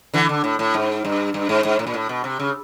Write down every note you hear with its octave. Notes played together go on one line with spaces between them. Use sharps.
D3 E3
D3
A2
A2
G#2
G2
G2
G#2
G#2
A2
A#2
A2
B2
C3
C#3